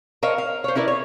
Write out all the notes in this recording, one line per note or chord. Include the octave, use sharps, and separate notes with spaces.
A#4 C5 C#5 D#5 F5
F5
C5 C#5
C#4 E4 A#4 B4 D5
C#5